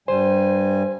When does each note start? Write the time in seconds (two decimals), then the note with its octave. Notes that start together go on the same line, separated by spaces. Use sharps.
0.08 G2 G3 C5 G#5